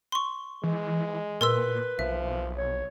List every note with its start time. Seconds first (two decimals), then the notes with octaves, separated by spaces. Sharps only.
0.12 C6 C#6
0.63 E3 G#3
1.41 A#2 A#4 B4 C6 E6
1.99 B1 F3 E5
2.57 C#5